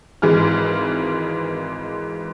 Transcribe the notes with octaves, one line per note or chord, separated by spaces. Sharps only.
G#1 G#2 E3 G#3 F6